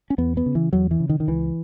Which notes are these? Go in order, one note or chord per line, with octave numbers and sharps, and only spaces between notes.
C#4
E2 B3
B3
C#3
E3
E2 F#3
E3
C#3
D#3
D#3
C#2 E3